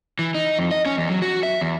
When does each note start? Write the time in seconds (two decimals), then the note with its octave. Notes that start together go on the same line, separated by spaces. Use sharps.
0.19 E3
0.34 D#4
0.59 F2
0.71 D#5
0.86 C#4
0.97 E2
1.10 F#3
1.22 F#4
1.43 E5
1.61 E2